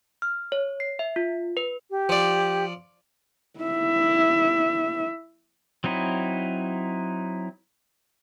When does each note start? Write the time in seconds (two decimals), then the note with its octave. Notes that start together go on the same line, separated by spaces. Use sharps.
0.22 F6
0.52 C#5
0.80 C7
0.99 E5
1.16 F4
1.57 B4
1.90 G4
2.09 F3 D5
3.60 E4 E5
5.84 F#3 C4 D#4 E4